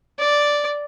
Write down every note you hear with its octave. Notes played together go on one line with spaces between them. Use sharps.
D5